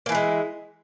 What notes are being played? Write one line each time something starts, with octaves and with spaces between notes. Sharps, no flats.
E3 G#3 A#3 E4